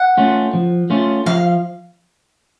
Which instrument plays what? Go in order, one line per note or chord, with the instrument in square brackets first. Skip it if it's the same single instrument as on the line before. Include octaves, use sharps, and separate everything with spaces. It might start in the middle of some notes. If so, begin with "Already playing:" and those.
Already playing: [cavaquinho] F#5
[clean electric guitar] A3 C#4 F4
F3
A3 C#4 F4
[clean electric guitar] F3 [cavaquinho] F5